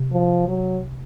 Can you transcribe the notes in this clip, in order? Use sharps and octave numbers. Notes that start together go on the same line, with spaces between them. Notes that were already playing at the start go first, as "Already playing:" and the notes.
Already playing: C3
F3
F#3